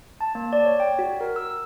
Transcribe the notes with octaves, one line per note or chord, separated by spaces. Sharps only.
A5
A#3
D5
C#5
G5
F#4
A#4
E6